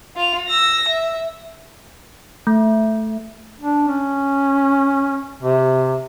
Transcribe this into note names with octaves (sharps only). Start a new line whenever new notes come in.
F4 F7
E6 A#6
E5
A3
D4
C#4
C3